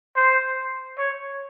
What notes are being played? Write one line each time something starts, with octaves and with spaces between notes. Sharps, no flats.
C5
C#5